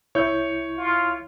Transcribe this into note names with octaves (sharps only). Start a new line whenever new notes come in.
C2 E4 C#5 G6
F4